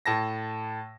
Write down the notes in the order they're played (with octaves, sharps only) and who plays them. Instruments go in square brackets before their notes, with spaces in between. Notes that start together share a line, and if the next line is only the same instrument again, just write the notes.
[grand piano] A2 A5 A#6